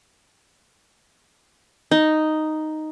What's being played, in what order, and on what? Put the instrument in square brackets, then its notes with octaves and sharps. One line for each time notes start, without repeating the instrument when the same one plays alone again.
[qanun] D#4